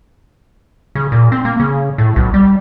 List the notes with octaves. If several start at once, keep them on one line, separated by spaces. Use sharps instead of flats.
C#3
A#2
C4
A#3
C#3
A2
B1
G3